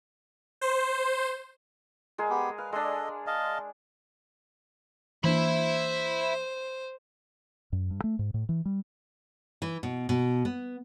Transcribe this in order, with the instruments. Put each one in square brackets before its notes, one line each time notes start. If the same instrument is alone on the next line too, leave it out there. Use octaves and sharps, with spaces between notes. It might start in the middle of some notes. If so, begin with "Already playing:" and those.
[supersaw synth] C5
[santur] G#3 G#4 A#4
[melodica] B3 G4
[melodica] B4 [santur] F5
[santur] G#3 D4 [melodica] A4 D#5
[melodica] D#5 F5 A5
[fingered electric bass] E3 A#3 D4 [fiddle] C5 [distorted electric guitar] E5 B5
[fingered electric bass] F#2
G2
A3
G#2
A2
E3
G3
[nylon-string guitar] E3
B2
B2
B3